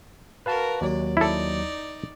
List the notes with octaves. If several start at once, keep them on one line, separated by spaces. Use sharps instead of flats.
F#4 A#4 B4 F5 A5
D#2 F#3 D5
D#4 E4 A4 D5